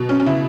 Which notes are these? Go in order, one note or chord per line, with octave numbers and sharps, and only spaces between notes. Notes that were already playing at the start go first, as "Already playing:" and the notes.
Already playing: B2 F#3
C#4
C#4
C#3 E4